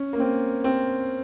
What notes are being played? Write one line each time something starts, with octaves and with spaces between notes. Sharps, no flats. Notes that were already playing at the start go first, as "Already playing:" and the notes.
Already playing: C#4
A#3
C4
C4